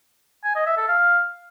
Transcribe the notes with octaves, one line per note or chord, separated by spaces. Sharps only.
G#5
D#5
E5
A4
F5